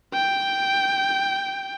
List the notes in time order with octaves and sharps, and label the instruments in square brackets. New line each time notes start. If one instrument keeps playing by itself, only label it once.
[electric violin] G5